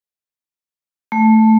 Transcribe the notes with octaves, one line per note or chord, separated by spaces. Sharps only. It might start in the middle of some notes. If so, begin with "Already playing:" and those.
A3